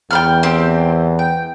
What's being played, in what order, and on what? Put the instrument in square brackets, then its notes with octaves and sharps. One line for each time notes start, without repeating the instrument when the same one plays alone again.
[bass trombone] E2 [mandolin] G5 B5 F6
[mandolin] C4 G4
G5